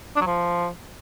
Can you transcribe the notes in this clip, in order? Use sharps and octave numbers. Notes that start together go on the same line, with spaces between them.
D4
F#3
F3